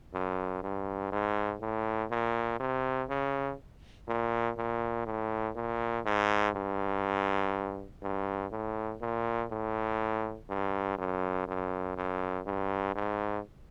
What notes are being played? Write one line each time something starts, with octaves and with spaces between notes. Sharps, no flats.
F#2
G2
G#2
A2
A#2
C3
C#3
A#2
A#2
A2
A#2
G#2
G2
G2
A2
A#2
A2
G2
F#2
F#2
F#2
G2
G#2